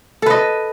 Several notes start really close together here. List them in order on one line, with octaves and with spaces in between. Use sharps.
A4 B4 D#5